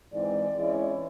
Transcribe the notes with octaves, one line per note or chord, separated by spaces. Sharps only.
G#2 E3 G#3 C4 D5
E3 G#3 C#4 E4